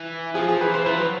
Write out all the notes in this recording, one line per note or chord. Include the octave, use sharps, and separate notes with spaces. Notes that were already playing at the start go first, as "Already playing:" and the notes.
Already playing: E3
F3 G#4
G#4
E3 B4
C5
F3 B4
F#3